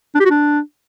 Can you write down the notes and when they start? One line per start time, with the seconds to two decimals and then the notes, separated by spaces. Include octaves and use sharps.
0.15 D4
0.20 G4
0.25 F#4
0.30 D4